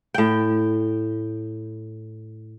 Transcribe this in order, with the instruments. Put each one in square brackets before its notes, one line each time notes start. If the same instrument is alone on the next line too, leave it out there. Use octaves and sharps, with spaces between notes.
[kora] A2 G5